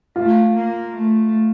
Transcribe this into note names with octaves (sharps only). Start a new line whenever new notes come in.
A3 F4
A#3
A3